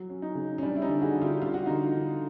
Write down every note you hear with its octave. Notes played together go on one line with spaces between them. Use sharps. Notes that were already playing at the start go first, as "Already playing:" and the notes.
Already playing: F#3
C#4
C#4 D#4
C#3
C#4
G3 D4
E4
C#4 D#4
D3
F#4 G#4
D3
F4 G4
G3 F4
F#4
D3 D#4 F4
D3